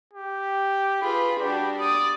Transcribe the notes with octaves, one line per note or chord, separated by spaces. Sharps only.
G4
F4 G#4 B4 B5
G3 D4 F#4 G4
D5 D#6